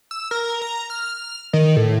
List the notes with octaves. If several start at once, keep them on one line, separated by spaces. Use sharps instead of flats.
E6
A#4
A#5
F6
D#3
A2